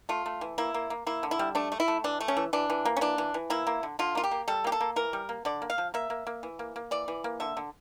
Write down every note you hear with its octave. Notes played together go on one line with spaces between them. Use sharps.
A3 F4
A3
E3
A#3 E4
A#3
A#3
A#3 E4
D3
E4
G3
A3 D4
A3
E4
A3
E3 D4
A3
C#4
E3
E3 D4
E3
A#3
C#4
E3 D4
E3
E3
A#3 E4
A#3
D3
D3 F4
A#3 F4
G4
A#3
G3 A4
A#3 G4
A4
A#3
E3 A#4
G3
A#3
D3 D5
A#3
F5
F3
A#3 E5
A#3
A#3
E3
A#3
A#3
E3 D5
E3
A#3
D3 E5
D3